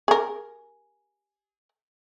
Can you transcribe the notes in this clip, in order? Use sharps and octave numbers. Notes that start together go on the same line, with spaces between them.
G#4 A#4